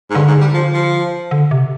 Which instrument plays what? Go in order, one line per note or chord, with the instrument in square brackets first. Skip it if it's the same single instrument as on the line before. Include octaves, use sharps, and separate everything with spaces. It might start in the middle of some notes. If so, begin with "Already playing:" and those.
[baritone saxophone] G#2
[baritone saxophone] G2 [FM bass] D3
[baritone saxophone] G#2
G3
F3
F3
[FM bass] D3
C3